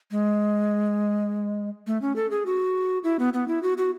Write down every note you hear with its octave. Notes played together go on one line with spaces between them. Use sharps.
G#3
A3
C#4
A4
G#4
F#4
E4
B3
B3
E4
F#4
F#4